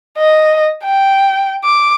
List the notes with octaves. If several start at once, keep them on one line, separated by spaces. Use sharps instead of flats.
D#5
G5
D6